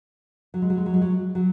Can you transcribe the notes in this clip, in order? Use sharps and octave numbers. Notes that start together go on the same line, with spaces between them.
F#3
G#3
F#3
G#3
F#3
G#3
F#3
F#3